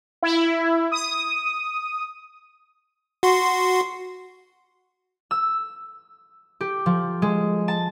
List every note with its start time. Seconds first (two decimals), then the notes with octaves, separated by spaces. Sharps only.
0.23 E4
0.92 D#6
3.23 F#4 C6
5.31 E6
6.61 G4
6.86 F3
7.22 G#3
7.68 A5